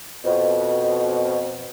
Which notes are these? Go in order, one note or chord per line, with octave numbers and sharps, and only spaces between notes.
F2 B2